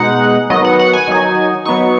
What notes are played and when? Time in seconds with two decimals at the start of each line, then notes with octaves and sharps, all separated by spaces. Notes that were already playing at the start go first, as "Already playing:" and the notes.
Already playing: B2 G#3 D#4 F#5
0.50 D#3 F#3 B3 D#5
0.65 F#5
0.79 F#5
0.93 G#5
1.08 D#3 F#3 D#4
1.65 F#3 B3 D#4 C#6